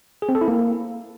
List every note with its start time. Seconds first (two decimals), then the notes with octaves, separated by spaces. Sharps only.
0.22 G#4
0.29 C4
0.35 A4
0.41 E4
0.48 A#3